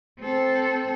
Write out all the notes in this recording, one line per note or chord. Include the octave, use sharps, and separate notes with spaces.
C4 A4